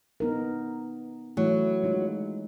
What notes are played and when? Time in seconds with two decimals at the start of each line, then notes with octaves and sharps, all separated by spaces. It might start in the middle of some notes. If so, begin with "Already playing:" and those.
0.20 B3 D#4 A#4
1.37 E3 F#3 A3 E4
1.84 G#3 D#4 F4